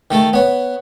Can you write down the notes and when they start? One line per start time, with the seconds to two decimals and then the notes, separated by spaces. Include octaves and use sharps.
0.11 D#3 A3 A4
0.33 B3 C#5